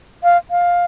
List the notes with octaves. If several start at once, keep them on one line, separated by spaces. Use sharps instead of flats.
F5
F5